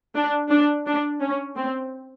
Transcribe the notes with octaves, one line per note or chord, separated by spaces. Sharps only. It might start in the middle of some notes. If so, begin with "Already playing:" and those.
D4
D4
D4
C#4
C4